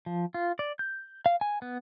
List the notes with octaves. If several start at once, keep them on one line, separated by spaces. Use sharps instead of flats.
F3
F4
D5
G6
F5
G#5
B3